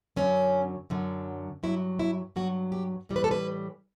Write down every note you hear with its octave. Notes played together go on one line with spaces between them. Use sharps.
F#2 D3 F#3 C#4
F#2 D3 F#3
G2 F#3 E4
E4
G2 F#3 F#4
G4
A2 E3 G3
B4
A4
B4